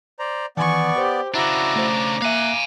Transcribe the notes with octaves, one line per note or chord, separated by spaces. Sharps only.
C5 D5 A#5
D#3 E3 B3 D5 G#5 C#6
G4 C5
C#3 D4 E4 F#4 A#5 D6
A3 C5
A#3 E5 F5 G#5 F#6